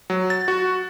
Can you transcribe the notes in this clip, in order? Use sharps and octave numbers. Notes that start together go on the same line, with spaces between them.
F#3
A6
F#4